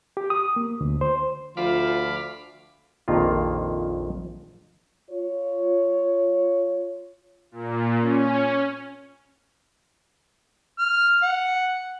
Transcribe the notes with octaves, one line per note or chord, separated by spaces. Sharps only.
G4
D#6
A#3
D2
C5
D2 F3 F5 B5 D6
A#1 F2 D#3 A#3 F4
F4 C#5
A#2
C#4
F6
F#5